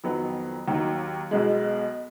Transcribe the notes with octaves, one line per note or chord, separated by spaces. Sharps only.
F2 D#3 F#3 B3
D#2 D#3 F#3
B1 B2 G#3